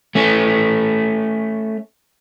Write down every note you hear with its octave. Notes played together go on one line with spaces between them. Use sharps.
A3 C#4